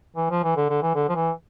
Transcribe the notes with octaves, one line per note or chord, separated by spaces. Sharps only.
E3
F3
E3
D3
D3
E3
D3
F3
E3